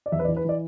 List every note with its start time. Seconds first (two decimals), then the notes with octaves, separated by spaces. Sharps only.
0.06 D5
0.12 E2 E5
0.19 B4
0.25 D5
0.28 E3
0.36 B4
0.45 E3 D5